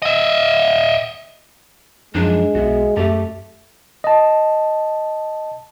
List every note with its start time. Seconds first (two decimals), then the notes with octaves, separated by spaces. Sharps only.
0.02 D#5 E5
2.15 F#2 F3 F#3 G#3 D4 D#4
2.55 B1 B3 F#4 E5
2.97 F#2 A3 G4 E5 A5
4.04 D#5 A5